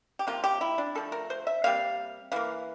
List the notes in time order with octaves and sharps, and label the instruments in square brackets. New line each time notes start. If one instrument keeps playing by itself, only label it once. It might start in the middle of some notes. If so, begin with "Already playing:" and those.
[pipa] G4
C3 F3 A#3 F4
G4
E4
D4
D3 F3 A3 A4
A#4
C5
E5
C3 G3 A#3 F5
E3 A#3 F5